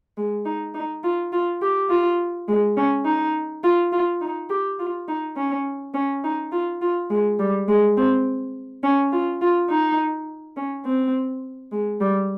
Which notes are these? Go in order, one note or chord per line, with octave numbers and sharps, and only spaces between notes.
G#3
D#4
D#4
F4
F4
G4
F4
G#3
C#4
D#4
F4
F4
D#4
G4
F4
D#4
C#4
C#4
D#4
F4
F4
G#3
G3
G#3
C4
C#4
F4
F4
D#4
C#4
C4
G#3
G3